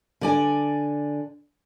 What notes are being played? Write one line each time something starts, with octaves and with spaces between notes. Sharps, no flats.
D3 D5 G#5